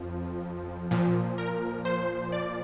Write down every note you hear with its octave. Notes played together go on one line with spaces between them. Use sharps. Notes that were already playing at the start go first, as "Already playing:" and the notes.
Already playing: F2 F3
A#2 F3
A#4
C5
D5